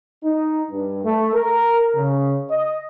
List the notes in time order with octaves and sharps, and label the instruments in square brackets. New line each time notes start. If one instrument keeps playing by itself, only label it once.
[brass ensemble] D#4
G2
A3
A#4
C#3
D#5